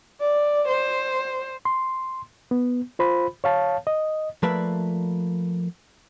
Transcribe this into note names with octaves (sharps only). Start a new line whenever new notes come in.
D5
C5
C6
B3
F4 C5 B5
C#5 F5 A5
D#5
F3 A3 A#3 B4 D5 E5